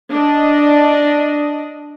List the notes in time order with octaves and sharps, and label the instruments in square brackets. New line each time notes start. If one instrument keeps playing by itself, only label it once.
[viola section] D4 D#5